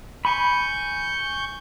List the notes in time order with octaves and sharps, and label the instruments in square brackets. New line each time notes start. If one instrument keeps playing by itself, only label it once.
[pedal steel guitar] G#5 B5 [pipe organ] C#6 G6